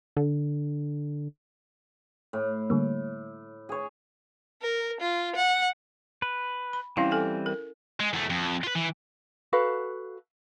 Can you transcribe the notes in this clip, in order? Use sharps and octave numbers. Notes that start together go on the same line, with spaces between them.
D3
A2
D3 G3 A#3
G#4 C#5
A#4
F4
F#5
B4
B5
E3 G3 C4 C#4 E4 F5
A4 G#5
A#4
G#3
E2 A3
F2
F4 B4
E3
F#4 A4 B4 F5